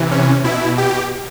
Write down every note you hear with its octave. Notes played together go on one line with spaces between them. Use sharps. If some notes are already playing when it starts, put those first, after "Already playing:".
Already playing: C3 E3
C#4
B2 E4
G4